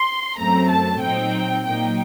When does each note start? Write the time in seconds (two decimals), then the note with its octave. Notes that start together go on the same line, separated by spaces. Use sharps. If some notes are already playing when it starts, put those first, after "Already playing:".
Already playing: C6
0.37 F#2 F#3 A3 C4 A#5
0.69 A5
1.01 A#2 F#3 C4 D#4 G5
1.64 A#2 F#3 A#3 D#4 G5